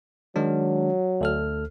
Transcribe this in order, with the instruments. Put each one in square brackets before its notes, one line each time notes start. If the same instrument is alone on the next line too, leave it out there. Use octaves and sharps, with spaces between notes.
[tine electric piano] D#3 G#3 D4 [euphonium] F#3
[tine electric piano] D2 A4 F6